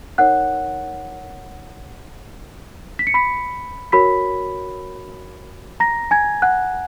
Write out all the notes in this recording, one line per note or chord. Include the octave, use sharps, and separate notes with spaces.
D#4 A#4 C#5 F#5 F#6
B6
C#7
B5 B6
F#4 A#4 C#5 B5 B6
A#5 A#6
G#5 G#6
F#5 F#6